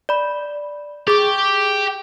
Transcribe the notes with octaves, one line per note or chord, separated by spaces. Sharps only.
D5 B5
G4 G#4 D6